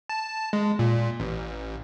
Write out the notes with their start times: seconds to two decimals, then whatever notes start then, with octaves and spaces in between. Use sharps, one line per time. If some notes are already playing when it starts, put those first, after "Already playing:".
0.09 A5
0.53 G#3
0.79 A#2
1.19 A1